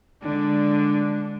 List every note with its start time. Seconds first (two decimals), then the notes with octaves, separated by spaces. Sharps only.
0.23 D3 G#3 D4